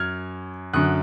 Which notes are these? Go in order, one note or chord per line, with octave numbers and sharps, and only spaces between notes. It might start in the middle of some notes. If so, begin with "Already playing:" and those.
Already playing: F#2 F6 G#6
F#2 D3 D#6 F#6